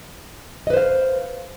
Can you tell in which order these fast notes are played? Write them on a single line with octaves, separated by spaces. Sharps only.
D#5 B4 C5 F5